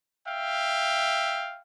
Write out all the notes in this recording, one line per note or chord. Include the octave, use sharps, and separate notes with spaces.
E5 F5 G5